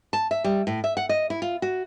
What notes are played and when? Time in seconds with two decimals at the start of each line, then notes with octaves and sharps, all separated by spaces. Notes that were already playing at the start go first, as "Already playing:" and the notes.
0.13 A5
0.31 E5
0.44 G3
0.67 A2
0.84 E5
0.97 F#5
1.09 D#5
1.30 E4
1.42 F4
1.62 F#4